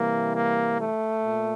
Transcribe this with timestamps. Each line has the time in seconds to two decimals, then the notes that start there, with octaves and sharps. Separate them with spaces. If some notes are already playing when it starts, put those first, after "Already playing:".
Already playing: C3 E3 G3 A#3
0.34 A#3
0.80 A3
1.25 A#2